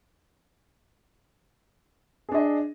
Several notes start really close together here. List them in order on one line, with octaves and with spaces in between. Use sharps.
G#4 D4 D#5